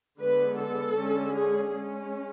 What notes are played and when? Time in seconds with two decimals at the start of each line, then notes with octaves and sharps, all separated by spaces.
0.19 D3 G#3 B3 B4
0.58 A4
0.96 D3 G#3 C#4
1.35 G#4
1.73 G#3 C#4